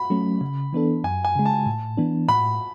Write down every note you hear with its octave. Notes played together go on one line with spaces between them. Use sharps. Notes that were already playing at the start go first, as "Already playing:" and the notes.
Already playing: B5
F#3 A3 C#4
C#3
E3 B3 D4 A4
F#2 G#5
G#5
C#3 G#3
A5
A2
E3 B3 D4
A2 B5